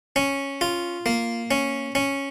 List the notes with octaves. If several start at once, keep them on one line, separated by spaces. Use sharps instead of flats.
C#4
F4
A#3
C#4
C#4